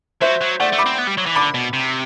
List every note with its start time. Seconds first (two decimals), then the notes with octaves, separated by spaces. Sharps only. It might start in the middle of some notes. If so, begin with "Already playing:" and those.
0.21 F#3 C5 E5
0.41 F#3
0.60 A3 D5 F#5
0.72 A3
0.78 B5 D6
0.86 C4
0.98 B3
1.07 G3
1.17 F#3
1.26 E3
1.35 D3 B5 D6
1.54 B2
1.73 C3